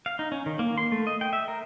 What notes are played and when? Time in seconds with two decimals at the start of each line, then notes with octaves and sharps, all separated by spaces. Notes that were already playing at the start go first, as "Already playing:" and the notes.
0.06 F5
0.19 D#4
0.32 C#4
0.46 D#3
0.59 A#3
0.78 C6
0.92 A3
1.07 D#5
1.21 G5
1.33 E5
1.48 A#4